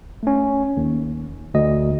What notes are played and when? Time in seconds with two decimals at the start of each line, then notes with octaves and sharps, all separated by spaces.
0.23 A3 C#4
0.77 D#2
1.54 D2 D#5